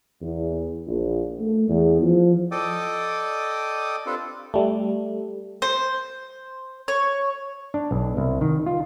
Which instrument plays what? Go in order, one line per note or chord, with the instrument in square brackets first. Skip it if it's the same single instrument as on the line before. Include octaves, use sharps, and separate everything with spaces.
[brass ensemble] E2
A#1
A3
E2
F3
[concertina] A4 D5 D#5 G5 D6 D#6
C4 D4 F4 G4 A4 B4
[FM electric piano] G3 A3
[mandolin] C5
C#5
[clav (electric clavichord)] D4
B1
C2
D#3
F4